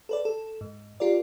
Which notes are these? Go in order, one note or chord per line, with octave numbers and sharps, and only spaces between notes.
A4 B4 D5
A4
G#2
F4 G4 A#4 D5